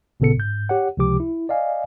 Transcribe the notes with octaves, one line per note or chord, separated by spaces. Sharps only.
A1 A#2 C#3 B3 A4 C#7
G#2 G6
G4 C#5 F#5
C#2 C3 F3 G4 D6
E4
D5 D#5 F5 G#5